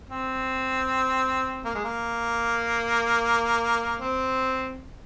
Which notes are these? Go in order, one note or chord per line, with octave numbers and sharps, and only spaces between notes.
C4
A#3
G#3
A#3
C4